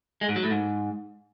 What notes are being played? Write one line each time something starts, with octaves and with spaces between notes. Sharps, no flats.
G#3
G#2
F#3
A2
G#2